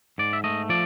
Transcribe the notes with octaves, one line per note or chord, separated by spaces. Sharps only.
G#2 D5
E5
A3 D#5
F3 D5